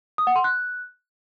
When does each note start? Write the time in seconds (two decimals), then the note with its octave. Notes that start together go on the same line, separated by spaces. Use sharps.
0.18 D#6
0.27 F#5
0.36 C6
0.44 F#6